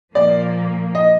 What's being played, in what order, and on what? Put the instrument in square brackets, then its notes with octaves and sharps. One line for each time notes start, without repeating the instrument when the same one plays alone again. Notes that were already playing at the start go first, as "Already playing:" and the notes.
[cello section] A#2 F3 A#3 [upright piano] D5
[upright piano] D#5